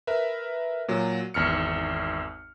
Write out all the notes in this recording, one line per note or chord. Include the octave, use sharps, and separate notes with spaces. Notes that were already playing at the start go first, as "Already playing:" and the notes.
A#4 B4 E5
A#2 F#3
G#1 E2 F6 C#7